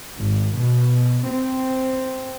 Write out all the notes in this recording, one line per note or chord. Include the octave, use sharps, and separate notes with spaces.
G#1
B2
C4